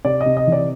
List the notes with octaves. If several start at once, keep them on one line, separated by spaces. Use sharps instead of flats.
C3 D5
D#5
C3
D#5
E3
D5